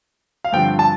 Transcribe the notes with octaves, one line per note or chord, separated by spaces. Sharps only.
F5
G2 D3 F3 C4 G5
A5